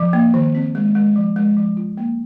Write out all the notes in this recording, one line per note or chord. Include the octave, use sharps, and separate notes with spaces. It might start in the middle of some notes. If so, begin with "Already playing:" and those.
Already playing: F3
A#3
D#3
C4
G#3
G#3
F3
G#3
F3
F4
A#3